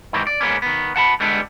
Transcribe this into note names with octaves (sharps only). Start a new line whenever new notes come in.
G#2 C3 D#3 E3 C4
D5
G#2 C#3 A#3 B3 C#4
D#3 B3
F#5 A5 B5
D3 G3 G#3 B3 D4